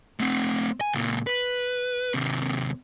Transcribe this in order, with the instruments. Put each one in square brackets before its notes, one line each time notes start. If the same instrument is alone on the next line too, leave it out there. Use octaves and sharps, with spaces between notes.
[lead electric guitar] A3 C4
G#5
C#2 A#2
B4
D#2 C3